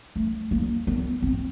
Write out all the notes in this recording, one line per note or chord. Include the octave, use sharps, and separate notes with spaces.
A3
A#3
B3
C4